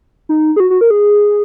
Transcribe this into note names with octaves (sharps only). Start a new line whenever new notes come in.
D#4
G#4
F#4
F#4
A#4
G#4